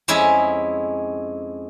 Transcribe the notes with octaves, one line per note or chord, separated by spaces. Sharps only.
F2 G#3 C#4 E4 G#4 E5